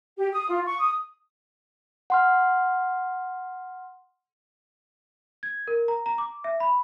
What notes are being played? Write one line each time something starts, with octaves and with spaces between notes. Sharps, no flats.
G4
D#6
F4
C#6
D#6
F#5 C6 F6
G#6
A#4
A#5
A#5
D6
E5
B5